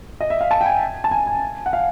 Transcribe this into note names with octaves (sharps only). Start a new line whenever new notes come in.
D#5
E5
F5
A5
G5
G#5
A5
G#5
G#5
F#5
F5